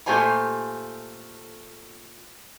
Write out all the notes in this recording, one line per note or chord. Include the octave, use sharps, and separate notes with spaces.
A#2 A3 G4 C5 G#5 A#5